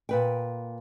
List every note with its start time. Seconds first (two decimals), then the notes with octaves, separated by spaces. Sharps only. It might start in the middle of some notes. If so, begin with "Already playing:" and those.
0.09 A#2 B4 G5